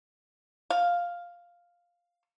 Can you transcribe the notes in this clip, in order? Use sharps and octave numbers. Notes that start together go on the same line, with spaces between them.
F5